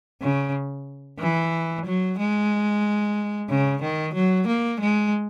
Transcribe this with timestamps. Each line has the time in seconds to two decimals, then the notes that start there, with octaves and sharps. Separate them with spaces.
0.22 C#3
1.20 E3
1.86 F#3
2.19 G#3
3.50 C#3
3.83 D#3
4.15 F#3
4.47 A#3
4.81 G#3